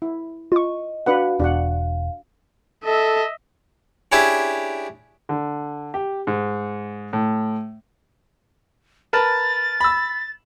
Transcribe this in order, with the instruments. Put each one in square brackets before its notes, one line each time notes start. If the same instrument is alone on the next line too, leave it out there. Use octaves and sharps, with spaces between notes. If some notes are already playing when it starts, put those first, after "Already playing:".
[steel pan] E4
[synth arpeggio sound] F4 C#6 [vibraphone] D#5
[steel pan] D4 B4 F#5 [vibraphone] F#4 F5
[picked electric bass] E1 [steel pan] D4 F#4 F#5 [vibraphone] F5
[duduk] A4 [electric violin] D#5 E5
[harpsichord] C#4 D4 E4 G4 G#4 E5
[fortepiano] D3
G4
G#2
A2
[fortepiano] A#4 B4 A5 [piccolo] A6
[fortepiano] B5 E6